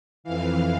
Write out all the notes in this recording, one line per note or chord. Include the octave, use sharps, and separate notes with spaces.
F2 E3 F5